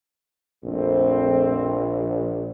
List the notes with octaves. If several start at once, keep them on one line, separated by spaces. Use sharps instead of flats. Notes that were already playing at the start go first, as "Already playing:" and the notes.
A#1 F2 A3 C4